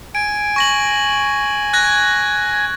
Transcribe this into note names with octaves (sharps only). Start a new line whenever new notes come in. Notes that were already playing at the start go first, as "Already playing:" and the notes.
G#5 D7
C#6 A#6 F#7
F#6 G#6 A#6